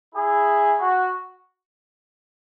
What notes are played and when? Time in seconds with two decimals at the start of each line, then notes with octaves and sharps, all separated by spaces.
0.15 E4 G#4
0.80 F#4